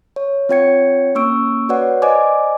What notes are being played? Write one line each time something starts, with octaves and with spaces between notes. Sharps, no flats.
C#5
C4 F4 C#5 G5 G#6 C#7
A#3 C#4 C#6 E6 D7
F#4 B4 C#5 D5 F#5
C5 D5 D#5 G#5 D6